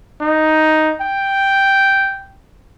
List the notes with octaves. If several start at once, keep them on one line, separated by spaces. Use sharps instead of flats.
D#4
G5